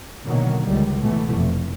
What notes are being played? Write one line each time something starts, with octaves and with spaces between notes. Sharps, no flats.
B2 D3 D#3 F#3 A#3
C#2 D#3 G3
B2 E3 A3
F1